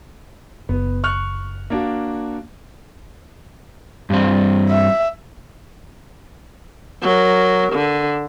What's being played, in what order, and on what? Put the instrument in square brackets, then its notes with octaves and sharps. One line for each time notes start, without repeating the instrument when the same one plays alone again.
[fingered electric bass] F#1 [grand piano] B3
[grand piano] C#6 F6 F#6
A#3 D4 F#4
[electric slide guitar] G2 C4
[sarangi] E5
[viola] F#3 A#4
D3